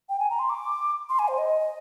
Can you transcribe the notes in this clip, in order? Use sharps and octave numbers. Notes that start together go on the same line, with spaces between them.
G5
G#5
A#5
C6
D6
C6
G#5
C5
D#5